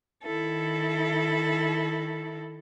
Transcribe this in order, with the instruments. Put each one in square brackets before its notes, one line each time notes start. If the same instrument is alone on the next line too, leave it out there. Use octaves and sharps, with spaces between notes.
[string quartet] D#3 E4 A4